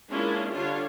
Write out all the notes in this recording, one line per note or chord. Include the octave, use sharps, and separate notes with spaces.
G#3 A#3 C#4 D4 E4 F4
D3 G3 D4 F4 C#5 F5